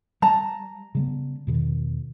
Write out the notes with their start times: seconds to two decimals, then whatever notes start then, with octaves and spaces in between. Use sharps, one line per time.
0.22 G3 A5 A#5
0.95 C#3 G3 B3
1.47 E2 B2 D#3